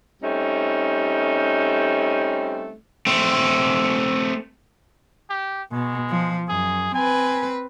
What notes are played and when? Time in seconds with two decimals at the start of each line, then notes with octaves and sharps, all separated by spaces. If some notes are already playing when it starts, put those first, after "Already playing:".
0.23 G3 A3 C4 C#4 D#4
3.07 A3 C4
5.30 G4
5.72 B2 G#3
6.10 F3
6.49 F#2 G#4
6.94 C4 B4 G#5